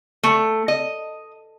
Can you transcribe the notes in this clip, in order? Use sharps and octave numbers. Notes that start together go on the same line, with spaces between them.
A3
D#5